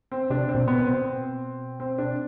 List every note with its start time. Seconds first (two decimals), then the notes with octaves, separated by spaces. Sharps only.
0.12 C4
0.30 C3 D4
0.49 C4
0.55 B2
0.68 B3
0.80 B2
0.87 C4
1.80 C4
1.98 D4